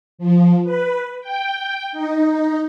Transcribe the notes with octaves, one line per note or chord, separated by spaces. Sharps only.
F3
B4
G5
D#4